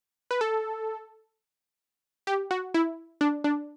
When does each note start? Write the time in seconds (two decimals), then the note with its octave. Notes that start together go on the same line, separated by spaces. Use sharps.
0.31 B4
0.41 A4
2.27 G4
2.51 F#4
2.74 E4
3.21 D4
3.44 D4